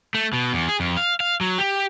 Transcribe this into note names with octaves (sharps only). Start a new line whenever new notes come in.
A3
B2
E2
G#4
F2
F5
F5
F#3
G4